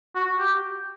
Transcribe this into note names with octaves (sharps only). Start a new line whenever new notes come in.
F#4
G4